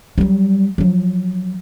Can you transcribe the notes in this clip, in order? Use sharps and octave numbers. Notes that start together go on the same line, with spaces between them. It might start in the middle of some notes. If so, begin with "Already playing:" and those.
F#3 G3
F3 F#3